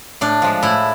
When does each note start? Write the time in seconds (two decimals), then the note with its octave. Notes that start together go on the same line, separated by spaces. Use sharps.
0.21 A2 D4
0.42 F3 G#3
0.62 A2 E4